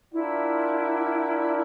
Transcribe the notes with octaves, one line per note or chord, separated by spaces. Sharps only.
D4 E4 F4 A#4 D5 F#5